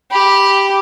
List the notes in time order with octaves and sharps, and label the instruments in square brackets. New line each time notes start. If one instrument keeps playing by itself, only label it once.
[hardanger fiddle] G4 [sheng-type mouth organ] B5